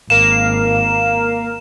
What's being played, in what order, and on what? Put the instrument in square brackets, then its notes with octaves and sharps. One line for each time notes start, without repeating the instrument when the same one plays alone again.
[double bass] G#1 [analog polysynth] A#3 A#4 F5 [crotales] E7